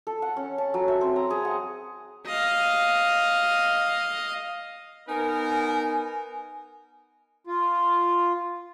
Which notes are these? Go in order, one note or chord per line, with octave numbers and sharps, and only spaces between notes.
A4
F#5
C#4
A5
F#3
E5
C4
A#5
G#4
F#5
D#5 F5
B3 D#4 A#4 G#5
F4